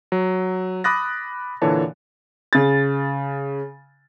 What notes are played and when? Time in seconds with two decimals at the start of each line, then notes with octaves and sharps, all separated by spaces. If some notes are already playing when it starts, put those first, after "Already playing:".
0.12 F#3
0.84 B5 D6 D#6 F#6 A6 A#6
1.62 A#2 D3 E3 C#5 A5
2.53 C#3 A6